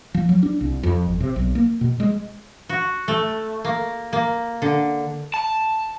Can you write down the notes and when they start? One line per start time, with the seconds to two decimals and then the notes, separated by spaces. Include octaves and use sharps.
0.14 F3
0.29 F#3
0.43 D4
0.61 C2
0.83 F2
1.06 G1
1.21 C3
1.36 B1
1.55 A#3
1.81 B2
2.00 G#3
2.69 F#4
3.08 A3
3.65 A#3
4.13 A#3
4.62 D3
5.34 A5